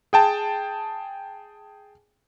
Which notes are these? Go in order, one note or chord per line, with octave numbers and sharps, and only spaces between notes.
G#4 G5 A5